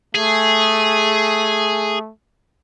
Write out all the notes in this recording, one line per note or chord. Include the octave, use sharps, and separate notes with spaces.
A3 G#4